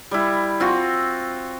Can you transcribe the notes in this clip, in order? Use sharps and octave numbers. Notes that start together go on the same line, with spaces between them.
G3 E4
C4 F4 F#4